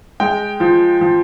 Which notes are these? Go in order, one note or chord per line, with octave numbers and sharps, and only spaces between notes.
G#3 G5
F3
F3